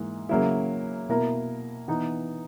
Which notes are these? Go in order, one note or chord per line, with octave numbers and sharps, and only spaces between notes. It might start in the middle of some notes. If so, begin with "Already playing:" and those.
Already playing: G#2 E3 A#3
C#3 F#3 A#3 C#4 E4
B2 A#3 E4 A#4
E3 B3 D#4